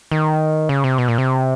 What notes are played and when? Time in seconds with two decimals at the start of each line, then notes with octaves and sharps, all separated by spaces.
0.11 D#3
0.69 C#3
0.84 C3
0.98 B2
1.08 A#2
1.18 C3